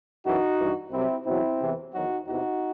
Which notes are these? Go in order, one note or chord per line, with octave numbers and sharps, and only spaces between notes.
F#2 E3 D#4 F#4
G2 E3
C2 C3 F#3 C4 E4
E2 B2 F#3 C4 E4
E2 C3 E3
E2 D#3 F#3 D#4 F#4
E2 C3 E3 D#4 F#4